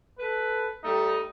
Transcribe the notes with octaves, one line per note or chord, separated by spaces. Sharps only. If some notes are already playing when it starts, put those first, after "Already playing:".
A4 B4
G3 A3 D#4